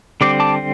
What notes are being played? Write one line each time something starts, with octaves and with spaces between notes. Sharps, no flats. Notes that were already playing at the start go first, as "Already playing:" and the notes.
D3 G3 C4 D6
A5 D6